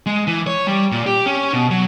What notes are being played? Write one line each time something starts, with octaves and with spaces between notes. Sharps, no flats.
G#3
E3
C#5
G3
A#2
G4
C#4
B2
F#3